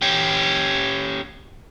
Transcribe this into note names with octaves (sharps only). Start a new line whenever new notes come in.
C#4 G4